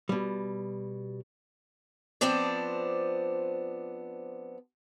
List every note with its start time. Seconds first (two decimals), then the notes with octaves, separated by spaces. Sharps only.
0.09 B2 G3
2.21 F3 B3 C4 D4 D5